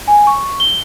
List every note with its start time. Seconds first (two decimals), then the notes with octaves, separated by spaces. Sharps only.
0.08 G#5
0.27 C#6
0.60 G7